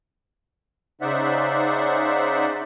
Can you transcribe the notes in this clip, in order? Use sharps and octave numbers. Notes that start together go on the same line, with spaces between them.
C#3 D#4 C5 D5 E5 F#5